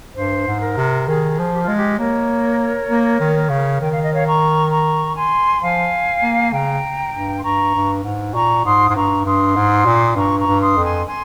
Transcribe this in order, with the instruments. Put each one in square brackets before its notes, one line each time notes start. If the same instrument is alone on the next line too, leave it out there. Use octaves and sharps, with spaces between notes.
[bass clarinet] G2 [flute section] C5
[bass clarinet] G#2
[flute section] A#4
[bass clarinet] C3
[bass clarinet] D#3 [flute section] G#4
[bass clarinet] F3
[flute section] G4
[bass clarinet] G#3 [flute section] F4
[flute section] G4
[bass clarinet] A#3 [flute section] A#4 C#5
[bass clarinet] A#3
D#3
C#3
[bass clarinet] D#3 [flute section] G5
[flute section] F5
D#5
C#5 F5
A#5 C#6
A#5 C#6
G#5 C6
[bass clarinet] F3 [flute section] F5 G#5
[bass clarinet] A#3
[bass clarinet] C#3 [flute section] G5 A#5
[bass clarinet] G2
[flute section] C6
[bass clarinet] G2 [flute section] A#5 C#6
[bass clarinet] G2
G#2
[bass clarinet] A#2 [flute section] A#5 C#6
[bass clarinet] G#2 [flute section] C6 D#6
[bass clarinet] G#2 [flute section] C6
[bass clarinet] G2 [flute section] A#5 C#6
[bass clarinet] G2 [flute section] C6 D#6
[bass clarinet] G#2
A#2
[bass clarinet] G2 [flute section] A#5 C#6
[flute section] A#5 C#6
[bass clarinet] G2
[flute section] C6 D#6
[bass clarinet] F2
[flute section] G#5 C6
G#5 C6